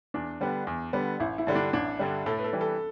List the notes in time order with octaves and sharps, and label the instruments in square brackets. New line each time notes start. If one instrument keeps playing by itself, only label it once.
[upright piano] E2 [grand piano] D4
[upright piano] D3 G3 B3
E2
D3 G3 B3
[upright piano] A1 [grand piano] E4
[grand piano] E4
[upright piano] G2 D3 G3
[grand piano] D4
[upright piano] A1 [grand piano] D4
[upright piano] G2 D3 G3
[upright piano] A2 [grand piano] A4
[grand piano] B4
A4
[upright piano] E3 G3
[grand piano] A4